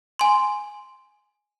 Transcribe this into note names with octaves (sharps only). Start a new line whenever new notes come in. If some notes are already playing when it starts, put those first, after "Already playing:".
G#5 C6